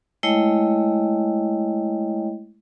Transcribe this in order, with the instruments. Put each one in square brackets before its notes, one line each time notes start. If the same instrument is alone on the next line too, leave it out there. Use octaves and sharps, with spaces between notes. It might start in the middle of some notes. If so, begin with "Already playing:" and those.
[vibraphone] G#3 A3 E4 C#5 D#5 G5